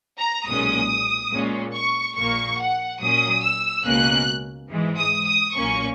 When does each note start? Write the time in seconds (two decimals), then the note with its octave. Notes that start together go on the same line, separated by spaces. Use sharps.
0.18 A#5
0.46 B1 A#2 G#3 C#4 D#6
1.32 A#2 G#3 C#4
1.73 C#6
2.15 A#1 A#2 A#3 C#6
2.58 F#5
3.00 A#2 F#3 C#4 D#6
3.42 E6
3.84 C#2 B2 A#3 C#4 F#6
4.69 G#2 E3 G#3
4.98 D#6
5.26 D#6
5.54 B1 A#2 A#3 C#4 C#6